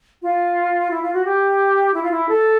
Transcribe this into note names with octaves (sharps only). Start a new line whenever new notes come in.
F4
E4
F4
F#4
G4
E4
F4
E4
A4